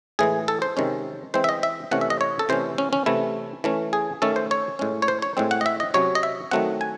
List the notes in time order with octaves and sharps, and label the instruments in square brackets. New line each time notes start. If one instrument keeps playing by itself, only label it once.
[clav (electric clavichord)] A2 E3 G#3 G#4
A4
C5
C3 D#3 G#3 C#4
E3 G#3 C4 C5
E5
D#5
E5
C3 E3 A3 C#4 F#5
E5
D#5
C#5
A4
C3 E3 A3 C#4 C5
C#4
C#4
C3 E3 A3 E4
E3 A3 C#4
G#4
D#3 A3 C#4 A4
C5
C#5
A2 G#3 C#4
C#5
C5
C#5
A2 G#3 C4
F#5
D#5
E5
D#5
C3 F#3 C#4 C#5
D#5
E5
D#3 F#3 A3 C4 F#5
G#5